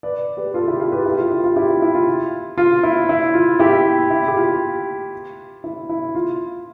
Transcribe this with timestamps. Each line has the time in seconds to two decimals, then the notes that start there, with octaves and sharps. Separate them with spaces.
0.03 B4 D5
0.37 G4 B4
0.54 F4 A4
0.68 E4 G4
0.80 F4 A4
0.92 G4 B4
1.05 E4 G4
1.19 F4
1.31 E4
1.44 F4
1.56 E4 G4
1.68 F4
1.82 E4
1.94 F4
2.58 F4
2.83 E4
3.09 E4
3.34 F4
3.59 E4 G4
4.11 E4
4.28 G4
4.36 F4
5.64 E4
5.89 E4
6.15 F4